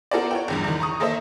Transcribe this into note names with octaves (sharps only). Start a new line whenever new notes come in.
B3 F4 A4 A#4 C5 D5
C#5 F#5 G5
A#1 E2 G2
E2 D#3
A#5 C#6 D#6
A#3 A4 C5 D#5 E5